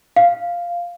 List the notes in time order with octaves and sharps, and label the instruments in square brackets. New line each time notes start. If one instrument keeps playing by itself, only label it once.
[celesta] F5